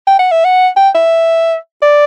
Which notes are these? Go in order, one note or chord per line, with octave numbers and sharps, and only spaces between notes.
G5
F#5
E5
F#5
G5
E5
D5